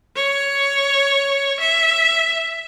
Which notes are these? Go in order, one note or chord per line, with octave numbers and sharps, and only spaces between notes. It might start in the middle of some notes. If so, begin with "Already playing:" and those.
C#5
E5